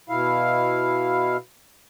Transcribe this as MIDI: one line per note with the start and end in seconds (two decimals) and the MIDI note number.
0.09 1.37 47
0.09 1.37 64
0.09 1.37 77